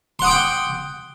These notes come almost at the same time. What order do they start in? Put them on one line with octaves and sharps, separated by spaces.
C6 F#5 D#6 D6 G5